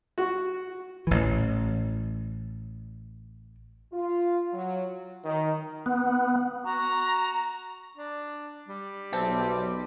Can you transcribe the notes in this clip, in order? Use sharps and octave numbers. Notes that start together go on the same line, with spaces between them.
F#4
A1 E3
F4
F#3
D#3
B3
F#4 A#5
D4
G3
B1 C4 E5 A5